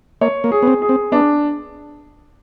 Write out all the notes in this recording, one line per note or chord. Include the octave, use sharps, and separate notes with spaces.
A#3 C#5
A#3
G#4
B3
C4
G#4
C4
B3 D4